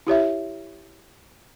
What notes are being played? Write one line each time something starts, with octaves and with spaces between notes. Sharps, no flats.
E4 G4 C#5 E5